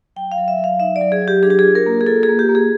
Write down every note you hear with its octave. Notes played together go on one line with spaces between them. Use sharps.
F#3 G5
F5
F#3
E5
F#3
F5
D#4 E5
D5
F#3
G#4
F#3
G4
D4 G#4
G4
G#4
F4
A#4
A#3
G#4
F4 A4
G#4
A#3
G4
A#3
G#4